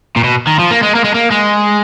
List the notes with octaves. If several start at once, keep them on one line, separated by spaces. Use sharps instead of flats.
A#2
B2
D#3
F3
A#3
G#3
A#3
G#3
A#3
G#3